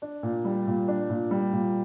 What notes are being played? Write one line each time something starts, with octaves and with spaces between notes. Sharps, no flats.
D4
A#2
G3
A#2
D4
A#2
G3
A#2